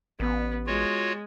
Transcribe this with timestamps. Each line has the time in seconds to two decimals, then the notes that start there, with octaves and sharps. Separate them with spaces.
0.20 A1 B3
0.67 G#3 F4 F#4 C#5